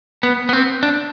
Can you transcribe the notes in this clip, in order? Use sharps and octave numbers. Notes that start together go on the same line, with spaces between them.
B3
B3
C4
D4